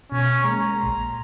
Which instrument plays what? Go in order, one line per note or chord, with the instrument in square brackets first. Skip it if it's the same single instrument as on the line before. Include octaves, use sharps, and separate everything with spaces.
[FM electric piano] B2 [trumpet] C#4
[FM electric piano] G#3 A#3 [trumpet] A#5
[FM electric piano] A#1 A#2 C6